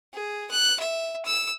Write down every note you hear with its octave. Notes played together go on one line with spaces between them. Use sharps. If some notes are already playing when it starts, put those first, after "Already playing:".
G#4
F#6
E5
E6